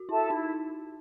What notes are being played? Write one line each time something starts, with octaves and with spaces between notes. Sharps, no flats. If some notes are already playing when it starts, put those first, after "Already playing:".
Already playing: F#4
E4 A4 E5 A5
D#4 E4